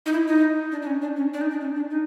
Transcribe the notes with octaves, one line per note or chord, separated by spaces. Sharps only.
D#4
E4
D#4
D4
D4
C#4
D4
C#4
D4
D#4
D4
C#4
D4
D#4